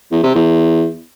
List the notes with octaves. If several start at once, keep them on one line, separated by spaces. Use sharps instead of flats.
E2
C3
E2